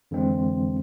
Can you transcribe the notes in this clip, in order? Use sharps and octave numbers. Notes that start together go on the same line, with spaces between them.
F2 D3 E3 G#3 C4